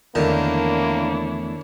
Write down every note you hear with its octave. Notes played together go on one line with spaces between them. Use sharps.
E2 D3 D#3 A3 A#3 D4 E4 C#5